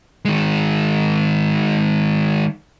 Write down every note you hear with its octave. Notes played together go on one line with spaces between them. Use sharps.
D#3 G#3